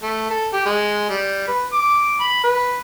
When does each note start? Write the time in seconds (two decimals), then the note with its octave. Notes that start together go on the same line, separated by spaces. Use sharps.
0.03 A3
0.30 A4
0.53 G4
0.66 G#3
1.10 G3
1.48 B4
1.73 D6
2.20 B5
2.44 B4